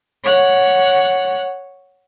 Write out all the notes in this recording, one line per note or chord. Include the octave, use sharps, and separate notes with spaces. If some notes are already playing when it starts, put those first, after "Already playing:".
C#5 F#5